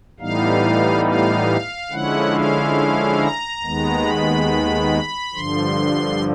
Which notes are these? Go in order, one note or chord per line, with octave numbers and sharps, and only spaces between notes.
A2 E3 G3 B3 D#4 F5
F5
D3 F3 G#3 C#4 E4 F#5
F5
A#5
D#2 D#3 G#3 B3
B5
G2 D3 F3 C6